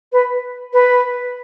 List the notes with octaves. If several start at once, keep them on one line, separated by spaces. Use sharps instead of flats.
B4
B4